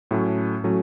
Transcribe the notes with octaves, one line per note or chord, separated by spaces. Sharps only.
A2 F#3 A3 C#4
A2 F#3 A3 C#4